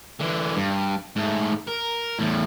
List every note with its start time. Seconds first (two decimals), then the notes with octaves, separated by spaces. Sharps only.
0.20 D3 E3
0.56 G2
1.16 G#2 A3
1.67 A#4
2.19 E2 A2